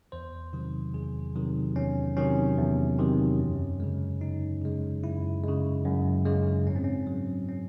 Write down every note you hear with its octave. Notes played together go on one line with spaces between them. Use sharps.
E2 C5
C3 D#3 F#3
E2 G#4
C3 D#3 F#3
E2 C#4
C3 D#3 F#3 C#4
E2
C3 D#3 F#3
F#2
C#3 G#3
F#2 D#4
C#3 G#3
F#2 E4
C#3 G#3
F#2
C#3 G#3
G#2 C#4
C4
C#4
F#3
C#4